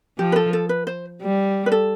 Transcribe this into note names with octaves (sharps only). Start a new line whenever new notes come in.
F3 G4
B4
A4
A4
B4
C5
G3
B4
A4